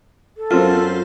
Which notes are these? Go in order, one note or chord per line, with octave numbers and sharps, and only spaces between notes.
A4
F#2 C4 F4